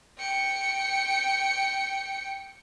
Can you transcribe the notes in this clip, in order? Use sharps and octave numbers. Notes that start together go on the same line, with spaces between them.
G5 C#7